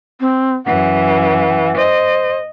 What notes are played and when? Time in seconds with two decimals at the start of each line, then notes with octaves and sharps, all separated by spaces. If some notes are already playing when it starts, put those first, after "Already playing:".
0.20 C4
0.66 F#2 E3 F#5
1.76 C5 D#5